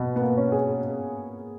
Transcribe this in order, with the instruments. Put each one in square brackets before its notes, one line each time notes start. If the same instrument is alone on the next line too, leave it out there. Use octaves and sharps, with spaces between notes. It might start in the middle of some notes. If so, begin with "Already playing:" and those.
Already playing: [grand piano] B2 [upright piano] A#3 B3
[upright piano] B3
A#3
[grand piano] C#4
[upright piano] G#4